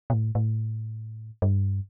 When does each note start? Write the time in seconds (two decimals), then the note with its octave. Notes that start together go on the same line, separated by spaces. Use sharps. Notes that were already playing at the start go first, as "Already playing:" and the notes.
0.10 B2
0.13 A2
0.35 A2
1.42 G2